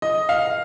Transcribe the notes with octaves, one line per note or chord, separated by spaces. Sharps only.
D#5
F5